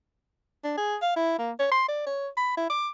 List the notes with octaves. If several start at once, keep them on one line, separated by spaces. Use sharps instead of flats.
D4
G#4
F5
E4
A#3
C#5
C6
D5
C#5
B5
E4
D6